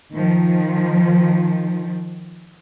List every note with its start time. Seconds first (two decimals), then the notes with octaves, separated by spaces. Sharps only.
0.12 D#3 F3